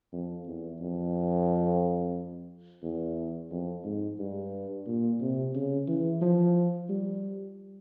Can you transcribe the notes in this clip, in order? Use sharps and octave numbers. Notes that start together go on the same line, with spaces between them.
F2
E2
F2
E2
F2
G#2
G2
A#2
C3
C#3
E3
F3
G3